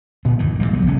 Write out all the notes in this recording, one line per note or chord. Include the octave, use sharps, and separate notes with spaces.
D1 G2 A#2 B3
G1 E2 A2 D#3
G#2 F#3 G3 A#3
C2 F3 F#3 B3
E1 F2 C#3 C#4